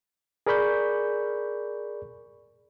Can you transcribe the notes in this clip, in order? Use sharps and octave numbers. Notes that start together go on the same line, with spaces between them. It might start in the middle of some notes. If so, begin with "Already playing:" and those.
G#4 A#4 D5 B5 C#6 G6